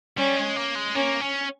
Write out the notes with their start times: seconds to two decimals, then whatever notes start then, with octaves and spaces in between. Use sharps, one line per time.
0.17 G3 C#4
0.36 G#3
0.56 A#3
0.75 G#3
0.95 A#3 C#4
1.21 C#4